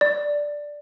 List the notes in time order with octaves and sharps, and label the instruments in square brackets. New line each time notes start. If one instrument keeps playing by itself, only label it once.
[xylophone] D5